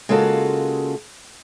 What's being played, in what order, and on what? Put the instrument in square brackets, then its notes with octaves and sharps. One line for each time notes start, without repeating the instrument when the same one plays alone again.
[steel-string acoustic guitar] C#3 G#3 A#3 F4 F#4 A4